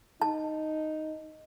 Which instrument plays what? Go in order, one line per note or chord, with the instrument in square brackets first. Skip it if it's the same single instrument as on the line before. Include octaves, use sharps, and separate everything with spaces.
[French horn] D#4 [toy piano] A5